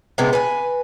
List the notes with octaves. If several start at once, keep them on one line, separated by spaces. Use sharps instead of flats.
C3 G#3 B3 D4
B4 G#5